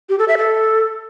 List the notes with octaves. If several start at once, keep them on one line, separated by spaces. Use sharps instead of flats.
G4
A4
E5
A4